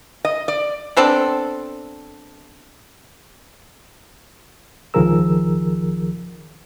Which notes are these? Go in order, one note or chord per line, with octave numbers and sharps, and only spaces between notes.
D#5
D5
B3 C4 D4 A4
C#2 D#3 F3 G#4 A#4 E6